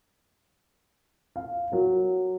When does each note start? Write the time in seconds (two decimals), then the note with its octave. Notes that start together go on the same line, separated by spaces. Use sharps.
1.36 F5
1.72 F#3 A#4